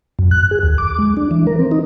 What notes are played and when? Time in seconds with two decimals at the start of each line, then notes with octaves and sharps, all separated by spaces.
0.19 F#2
0.31 F#6
0.51 G#4
0.63 D#2
0.78 D6
0.99 G#3
1.17 D4
1.31 E3
1.47 A#4
1.59 C4
1.71 D#4